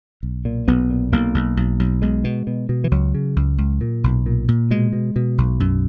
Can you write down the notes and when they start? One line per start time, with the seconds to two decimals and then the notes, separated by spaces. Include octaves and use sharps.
0.23 B1
0.45 A#2
0.68 B1 B3
0.90 A#2
1.12 B1 A#3
1.34 B1
1.57 B1
1.80 B1
2.02 B1 G#3
2.24 B2
2.47 B2
2.69 B2
2.84 E3
2.91 C#2 F#3
3.15 C#3
3.36 C#2
3.58 C#2
3.81 A#2
4.04 B1
4.26 A#2
4.48 A#2
4.71 B2 G#3
4.93 B2
5.16 B2
5.38 B1
5.60 F#2